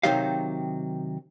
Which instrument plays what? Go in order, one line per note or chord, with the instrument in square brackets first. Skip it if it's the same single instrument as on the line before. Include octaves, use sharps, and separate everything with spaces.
[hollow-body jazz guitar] C3 D#3 F#3 D#4 G4 F5